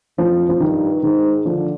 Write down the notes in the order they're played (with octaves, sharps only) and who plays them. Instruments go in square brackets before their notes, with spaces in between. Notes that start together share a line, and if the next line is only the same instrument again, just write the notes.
[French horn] F2 [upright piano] F3
[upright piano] F3
[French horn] G2 [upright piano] D#3
[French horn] G#2 [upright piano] D#3
[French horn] D3 [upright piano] F3